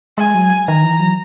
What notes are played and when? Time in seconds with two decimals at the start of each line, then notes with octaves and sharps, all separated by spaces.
0.18 G#3 G#5
0.35 F#3
0.68 D#3 A#5
0.84 E3
1.00 F#3